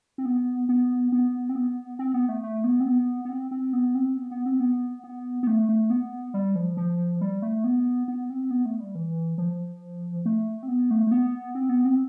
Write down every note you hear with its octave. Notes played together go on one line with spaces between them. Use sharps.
C4
B3
B3
B3
C4
B3
C4
B3
A3
A3
B3
C4
B3
B3
C4
C4
B3
C4
B3
B3
C4
B3
B3
B3
A3
A3
B3
G3
F3
F3
G3
A3
B3
B3
C4
B3
A3
G3
E3
F3
A3
C4
B3
A3
A3
B3
C4
B3
C4